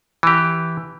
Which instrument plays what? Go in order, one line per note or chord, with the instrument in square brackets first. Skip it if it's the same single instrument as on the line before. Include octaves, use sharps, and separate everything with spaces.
[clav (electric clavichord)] E3 G4